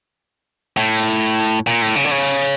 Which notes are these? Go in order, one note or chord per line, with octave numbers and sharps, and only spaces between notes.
A2
A#2
A2
C#3
D3
C#3